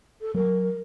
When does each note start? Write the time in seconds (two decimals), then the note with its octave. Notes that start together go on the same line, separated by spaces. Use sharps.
0.21 A4
0.35 F#3 A#4